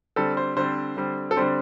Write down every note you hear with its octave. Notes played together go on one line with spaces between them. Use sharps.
D3 G3 C4 A4
C5
D3 G3 C4 C5
D3 G3 C4
A4
D3 G3 C4 C5